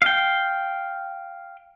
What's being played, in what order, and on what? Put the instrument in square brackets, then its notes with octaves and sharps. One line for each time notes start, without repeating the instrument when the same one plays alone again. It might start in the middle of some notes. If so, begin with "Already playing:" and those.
[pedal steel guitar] F5 G5